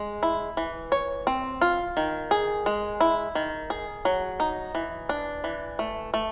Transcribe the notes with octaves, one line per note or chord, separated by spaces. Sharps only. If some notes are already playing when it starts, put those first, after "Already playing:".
Already playing: G#3
E4
E3
C#5
C4
F4
D#3
G#4
G#3
E4
D#3
G#4
F#3
D#4
E3
D4
E3
A3
A3